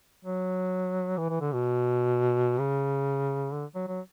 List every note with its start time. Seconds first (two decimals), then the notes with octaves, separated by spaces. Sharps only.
0.25 F#3
1.17 E3
1.29 E3
1.41 D3
1.53 B2
2.59 C#3
3.53 D3
3.75 F#3
3.88 F#3